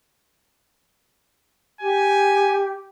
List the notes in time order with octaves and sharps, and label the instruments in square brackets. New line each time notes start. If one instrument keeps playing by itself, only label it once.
[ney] G4 [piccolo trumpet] G#5